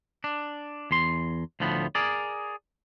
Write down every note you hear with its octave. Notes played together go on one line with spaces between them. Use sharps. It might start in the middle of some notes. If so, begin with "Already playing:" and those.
D4
E2 C6
D2 A2 F3 B3
G#4 A#4 D5